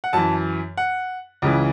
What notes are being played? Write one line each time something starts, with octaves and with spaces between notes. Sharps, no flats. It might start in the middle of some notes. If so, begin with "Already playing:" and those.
F#5
F#2 E3 A5
F#5
C#2 C#3 E3